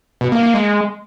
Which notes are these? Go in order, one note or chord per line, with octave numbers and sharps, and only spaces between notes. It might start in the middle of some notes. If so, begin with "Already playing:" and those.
B2
A#3
A#3
G#3